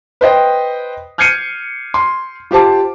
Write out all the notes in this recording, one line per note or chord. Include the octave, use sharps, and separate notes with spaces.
B4 C5 D#5 G5
F6 G6 G#6 C7 C#7 D#7
C6
F4 G4 C5 A5 D6